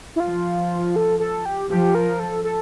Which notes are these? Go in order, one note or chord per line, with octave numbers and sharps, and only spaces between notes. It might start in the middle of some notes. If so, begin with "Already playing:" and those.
E4
F3 F4
A4
A4
G4
F3 G4
A#4
A4
A4